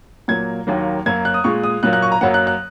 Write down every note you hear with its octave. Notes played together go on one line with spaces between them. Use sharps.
A#2 F#3 A#3 G#6
D#2 D#3 F#3 A#3
F#2 F#3 A#3 G#6
F#6
D#6
A#2 G#3 C#6
D#6
A#2 F#3 A#3 F#6
F#6
C#6
A#5
F#2 F#3 A#3 F#5
F#6
F#6